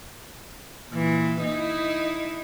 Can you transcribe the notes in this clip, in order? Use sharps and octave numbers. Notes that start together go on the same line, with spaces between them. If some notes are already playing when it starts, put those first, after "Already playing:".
A#2 E3
D#4 E4